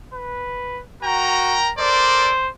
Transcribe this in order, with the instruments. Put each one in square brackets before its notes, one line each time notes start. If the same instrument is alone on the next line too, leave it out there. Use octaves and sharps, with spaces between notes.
[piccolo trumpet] B4
[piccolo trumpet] F#4 [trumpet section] A#4 G5 A#5
[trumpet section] A4 A#4 D5 [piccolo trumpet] C5